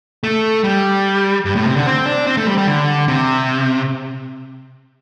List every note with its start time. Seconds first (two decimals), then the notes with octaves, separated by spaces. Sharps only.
0.23 A3
0.64 G3
1.45 G2
1.56 A2
1.65 C3
1.76 D3
1.86 C4
2.06 D4
2.27 C4
2.37 A3
2.47 G3
2.58 G3
2.67 D3
3.08 C3